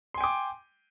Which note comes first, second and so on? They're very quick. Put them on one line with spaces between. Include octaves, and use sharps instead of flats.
C6 G#5 G5 D6